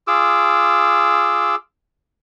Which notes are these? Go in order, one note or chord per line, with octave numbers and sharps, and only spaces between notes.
F4 G#4 D6 E6